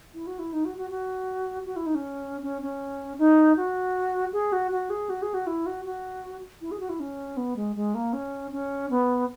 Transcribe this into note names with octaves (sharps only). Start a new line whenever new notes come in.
E4
F#4
E4
D#4
F#4
F#4
F#4
F#4
E4
D#4
C#4
C#4
C#4
D#4
F#4
G#4
F#4
F#4
G#4
F#4
G#4
F#4
E4
F#4
F#4
E4
G#4
F#4
E4
C#4
B3
G#3
G#3
A#3
C#4
C#4
B3